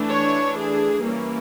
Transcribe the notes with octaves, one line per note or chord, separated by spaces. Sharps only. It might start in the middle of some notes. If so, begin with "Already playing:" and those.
Already playing: E3 A3 D4
C#5
G#4
E3 G3 A#3 C#4